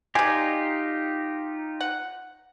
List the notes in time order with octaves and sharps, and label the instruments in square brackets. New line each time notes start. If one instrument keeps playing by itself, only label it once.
[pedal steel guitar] D#4 F4 G4 [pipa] D5 G#5
[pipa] F#5